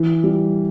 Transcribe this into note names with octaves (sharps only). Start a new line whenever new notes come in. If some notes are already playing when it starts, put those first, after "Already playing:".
Already playing: E3
G3